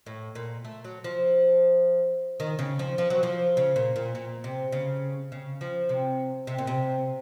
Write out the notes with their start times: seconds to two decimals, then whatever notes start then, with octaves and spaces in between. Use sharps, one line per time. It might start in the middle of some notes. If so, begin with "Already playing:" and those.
0.06 A2
0.35 A#2
0.65 A3
0.84 F#3
1.04 F3
2.40 D#3
2.59 C#3
2.79 F3
2.98 F3
3.10 F#3
3.23 F3
3.57 C#3
3.76 A#2
3.96 A#2
4.15 A#2
4.44 C3
4.72 C#3
5.32 C#3
5.61 F3
5.89 C3
6.47 C3
6.58 A#2
6.67 C3